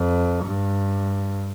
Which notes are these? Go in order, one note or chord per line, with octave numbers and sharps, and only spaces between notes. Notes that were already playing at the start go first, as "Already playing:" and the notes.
Already playing: F2
G2